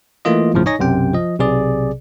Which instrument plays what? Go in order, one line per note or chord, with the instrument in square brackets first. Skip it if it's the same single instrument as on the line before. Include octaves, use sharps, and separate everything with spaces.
[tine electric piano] E3 A3 A#3 F4 D#5
G#1 F2 A2 C#3 F3
D#4 C#5 D#5 G#5 C#6 A#6
B1 F#2 C3 G5
F3 D#5
B1 C3 G#4 D5